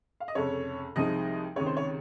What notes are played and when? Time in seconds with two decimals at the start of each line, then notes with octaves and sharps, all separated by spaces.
0.20 F5
0.28 D#5
0.35 F1 F2 C#3 C#5
0.96 C2 C3 F3 G#3 D#4 D#5
1.56 C#2 C3 D#3 C#5
1.66 C5
1.77 C#5